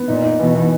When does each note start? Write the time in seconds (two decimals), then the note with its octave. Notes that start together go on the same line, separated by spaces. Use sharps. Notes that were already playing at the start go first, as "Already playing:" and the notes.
Already playing: B3
0.08 A#2 D#4
0.24 D#4
0.39 B2 E3
0.55 E3